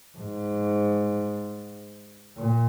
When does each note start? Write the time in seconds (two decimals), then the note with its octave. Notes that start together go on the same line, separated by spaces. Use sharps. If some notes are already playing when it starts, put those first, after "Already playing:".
0.17 G#2
2.37 A#2